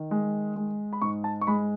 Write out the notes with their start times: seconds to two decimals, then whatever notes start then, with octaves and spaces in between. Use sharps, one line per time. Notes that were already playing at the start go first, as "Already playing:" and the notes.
Already playing: D#3
0.11 G#3
0.56 G#3
0.93 B5
1.02 G#2 C#6
1.24 A5
1.41 C#6
1.47 G#3 B5